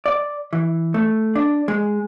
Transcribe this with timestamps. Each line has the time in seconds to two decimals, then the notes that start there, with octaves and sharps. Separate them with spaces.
0.06 D5
0.53 E3
0.94 A3
1.35 D4
1.68 G#3